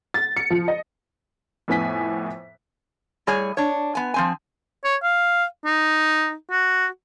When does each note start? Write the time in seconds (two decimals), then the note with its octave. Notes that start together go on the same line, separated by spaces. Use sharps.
0.14 A6
0.37 C#7
0.50 F3
0.68 D#5
1.68 F2 A2 B3 G#5 B6
3.27 A2 G3 G#4 C#5 G#5
3.57 D4 C#5
3.95 B3 G#5
4.14 F3 C4 G#5
4.84 C#5
5.03 F5
5.65 D#4
6.51 F#4